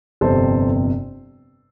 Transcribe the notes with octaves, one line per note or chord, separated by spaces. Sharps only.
G1 F2 C3 A4 C5